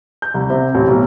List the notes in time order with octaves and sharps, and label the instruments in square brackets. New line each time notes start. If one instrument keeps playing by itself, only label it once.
[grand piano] G6
C2
C3
A1
B1